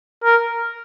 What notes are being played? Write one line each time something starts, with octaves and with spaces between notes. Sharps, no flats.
A#4